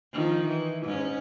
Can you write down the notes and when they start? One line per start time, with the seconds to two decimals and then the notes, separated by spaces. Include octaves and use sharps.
0.13 D#3 F3
0.48 E3
0.83 G#2 C#4